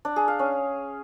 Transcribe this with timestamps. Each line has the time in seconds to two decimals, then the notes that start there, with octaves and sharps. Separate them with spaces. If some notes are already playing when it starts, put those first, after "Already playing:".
0.05 D4
0.16 G#4
0.28 F5
0.39 C#4